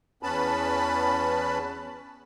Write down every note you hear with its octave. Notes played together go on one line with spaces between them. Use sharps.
E2 B3 C#4 B4 A5 B5